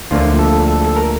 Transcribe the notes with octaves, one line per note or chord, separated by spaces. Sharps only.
D2 D3 F3 A#3 F4
A4
A4
A4
A#4